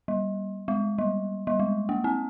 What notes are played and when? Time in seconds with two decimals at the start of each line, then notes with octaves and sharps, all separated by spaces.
0.08 G3
0.68 G#3
0.98 G3
1.47 G3
1.60 G#3
1.89 A#3
2.04 C4